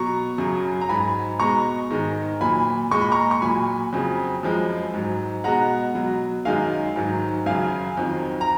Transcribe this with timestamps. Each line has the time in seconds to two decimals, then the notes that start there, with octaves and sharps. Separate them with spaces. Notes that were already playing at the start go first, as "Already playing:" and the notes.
Already playing: B2 F#3 A#5 C#6
0.38 F#2 C#3 F#3
0.81 A#5
0.89 G#2 F#3 G#5 B5
1.40 B2 G#3 A#5 C#6
1.91 G#2 D#3 G#3
2.41 A#2 F#3 G#5 B5
2.91 A#2 G#3 C#6
3.01 B5
3.11 A#5 C#6
3.31 C#6
3.42 A#2 F#3 G#5 B5
3.93 F2 C#3 F#3
4.43 F#2 F3 G#3
4.94 G#2 F#3
5.44 B2 G#3 F#5 A#5
5.95 B2 F#3
6.45 F#2 D#3 G#3 F5 G#5
6.96 G#2 D#3 F#3
7.46 F#2 C#3 F#3 F5 G#5
7.97 F2 D#3 F#3
8.41 A#5